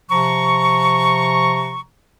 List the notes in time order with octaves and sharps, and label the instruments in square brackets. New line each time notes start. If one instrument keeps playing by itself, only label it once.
[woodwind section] C3 F3 A#5 C#6